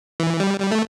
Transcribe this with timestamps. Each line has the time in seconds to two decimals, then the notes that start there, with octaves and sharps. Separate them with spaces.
0.20 E3
0.40 G3
0.60 G3
0.72 A3